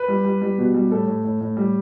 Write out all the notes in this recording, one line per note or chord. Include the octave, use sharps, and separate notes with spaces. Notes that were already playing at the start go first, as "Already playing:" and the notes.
Already playing: B4
G3
G3
G3
B2
G3
A2 A4
A2
A2
A2
G3